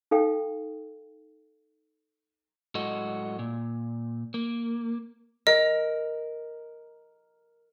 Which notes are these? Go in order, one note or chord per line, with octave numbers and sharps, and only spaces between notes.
D#4 A4 F5 G5
A2 F#3 G#3 F#4 A4 D#5
A#2
A#3
A#4 D#5